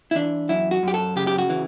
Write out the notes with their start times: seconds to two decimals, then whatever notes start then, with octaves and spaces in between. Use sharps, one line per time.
0.11 E4
0.15 E3 D4
0.49 F#2 E4
0.71 F#4
0.83 F#2 G4
0.94 A4
1.16 C#3 G4
1.27 G4
1.38 F#4
1.50 E3